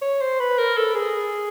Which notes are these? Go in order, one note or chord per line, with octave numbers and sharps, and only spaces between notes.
C#5
C5
B4
A#4
A4
G#4